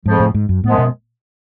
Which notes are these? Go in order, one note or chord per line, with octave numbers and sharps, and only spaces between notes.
F2 G#2 C#3 F3
A2
G#2
F#2
F#2 A2 F3 G#3 B3
B2